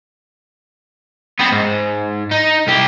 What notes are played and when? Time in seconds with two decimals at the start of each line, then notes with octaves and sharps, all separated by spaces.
1.39 B3 C4
1.52 G#2
2.31 D#4
2.67 C2 G4